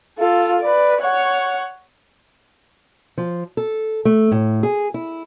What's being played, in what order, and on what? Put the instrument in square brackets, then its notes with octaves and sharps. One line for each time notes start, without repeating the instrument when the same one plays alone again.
[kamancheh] F4 A4
B4 D5
C#5 F#5
[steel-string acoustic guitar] F3
A4
A3
A2
G#4
E4